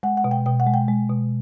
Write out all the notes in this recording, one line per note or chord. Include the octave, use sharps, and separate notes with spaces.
G#3 F#5
F#5
B2
G5
B2 G5
F#5
G#3
G5
G#3
B2